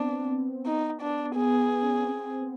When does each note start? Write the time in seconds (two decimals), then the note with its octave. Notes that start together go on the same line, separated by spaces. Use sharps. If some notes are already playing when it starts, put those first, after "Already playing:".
Already playing: B3 C4 D4
0.66 D#4
1.02 D4
1.36 B3 G#4
1.82 C#4
2.05 C4
2.40 B3